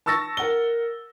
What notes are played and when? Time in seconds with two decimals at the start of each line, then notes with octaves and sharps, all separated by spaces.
0.06 A5 C#6 E6 A6 A#6
0.37 A#4 F#5 G7